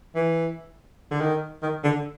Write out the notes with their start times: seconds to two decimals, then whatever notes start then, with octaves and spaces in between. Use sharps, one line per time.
0.15 E3
1.11 D3
1.20 D#3
1.62 D#3
1.83 D3